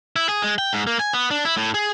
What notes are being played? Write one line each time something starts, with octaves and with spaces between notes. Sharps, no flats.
E4
G#4
G#3
G5
G#2
A#3
G#5
B3
D4
E4
A2
G#4